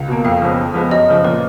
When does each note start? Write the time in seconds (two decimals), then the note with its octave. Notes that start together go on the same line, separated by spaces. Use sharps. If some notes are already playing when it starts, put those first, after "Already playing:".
Already playing: C#2
0.08 B2 A#3
0.24 F2 F5
0.41 C#3 F3 G#3 B3
0.58 F2
0.74 F3 G#3 B3
0.91 F#2 D#5
1.08 C#3 F3
1.25 A#2 B4